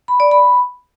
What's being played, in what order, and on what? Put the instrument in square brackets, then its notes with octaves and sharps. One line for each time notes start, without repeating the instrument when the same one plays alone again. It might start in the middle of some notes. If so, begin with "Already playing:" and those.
[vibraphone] B5
D5
B5